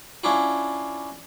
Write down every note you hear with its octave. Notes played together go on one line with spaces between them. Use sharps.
C#4 D4 E4 F4